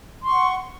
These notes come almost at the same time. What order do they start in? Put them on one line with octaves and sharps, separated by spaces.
C6 C#6 F#5